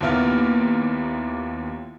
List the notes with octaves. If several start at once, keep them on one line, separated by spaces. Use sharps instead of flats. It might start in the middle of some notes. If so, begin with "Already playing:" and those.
D#2 A#2 A#3 B3 E4 F6